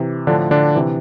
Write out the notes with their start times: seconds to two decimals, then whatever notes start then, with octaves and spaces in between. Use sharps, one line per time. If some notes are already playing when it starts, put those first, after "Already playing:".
Already playing: C3 E3
0.27 A2 D3 F3 D4
0.51 D3 D4
0.75 C3 E3